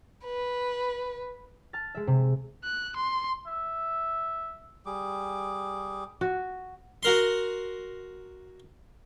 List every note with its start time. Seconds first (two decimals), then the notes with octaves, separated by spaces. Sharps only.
0.25 B4
1.73 A5 F6 A6
1.95 G#3 E5
2.07 C3
2.64 F#6
2.97 C6
3.47 E5
4.86 G3 G#4 D6
6.21 F#4
7.03 F#4 A#4 C6